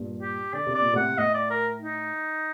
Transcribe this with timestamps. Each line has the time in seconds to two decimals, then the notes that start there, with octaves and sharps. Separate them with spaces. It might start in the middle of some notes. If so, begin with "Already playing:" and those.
Already playing: G2 A#2
0.21 G4
0.53 D3 D5
0.66 C3
0.75 D5
0.80 A#2
0.93 A2 C3 F#5
1.18 A2 D#5
1.34 D5
1.50 A#4
1.82 D#4